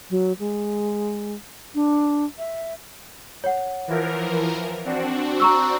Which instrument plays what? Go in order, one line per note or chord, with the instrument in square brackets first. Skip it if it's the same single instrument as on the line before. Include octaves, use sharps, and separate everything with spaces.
[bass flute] F#3
G#3
D4
E5
[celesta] C#5 F#5
[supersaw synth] E3 F3 A#4
C4 D4 F#4
[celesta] A#5 C#6 E6